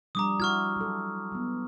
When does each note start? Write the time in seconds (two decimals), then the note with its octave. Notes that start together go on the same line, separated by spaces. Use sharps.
0.15 F3 G3 D4 A#5 D6 D#6
0.40 E4 F#4 C#6 F6 G#6
0.76 F#3 A4
1.32 F#3 B3